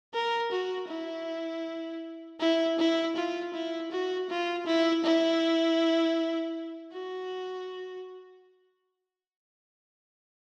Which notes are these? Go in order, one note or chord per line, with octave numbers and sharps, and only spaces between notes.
A#4
F#4
E4
E4
E4
F4
E4
F#4
F4
E4
E4
F#4